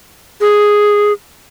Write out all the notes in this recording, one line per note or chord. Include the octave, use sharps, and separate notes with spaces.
G#4